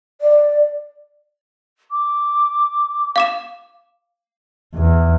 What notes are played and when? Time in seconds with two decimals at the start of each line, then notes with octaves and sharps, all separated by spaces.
0.21 D5
1.91 D6
3.16 F5 D6 E7
4.75 E2